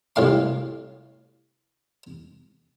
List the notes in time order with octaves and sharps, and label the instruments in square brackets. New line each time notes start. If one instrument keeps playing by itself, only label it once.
[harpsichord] C2 A2 F5 C6